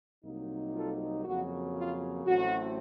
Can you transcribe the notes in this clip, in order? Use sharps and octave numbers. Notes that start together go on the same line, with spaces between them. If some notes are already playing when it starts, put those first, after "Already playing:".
C2 C3 F#3 A#3 D#4
F4 A4
F2 C#3 F#3 A#3 F#4
F4
A1 A2 F#3 A3 C4 F#4